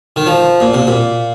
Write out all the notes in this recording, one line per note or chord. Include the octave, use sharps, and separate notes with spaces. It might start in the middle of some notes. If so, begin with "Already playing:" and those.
D#3
F3
A#2
C3
A#2